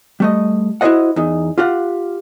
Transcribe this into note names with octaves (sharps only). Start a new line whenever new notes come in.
G3 A3 D#5
E4 F#4 A4 C5 D#5 F#5
E2 D#4
F4 G4 F5 F#5